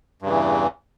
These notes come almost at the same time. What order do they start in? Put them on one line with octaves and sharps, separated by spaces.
G2 C#3 E3 E2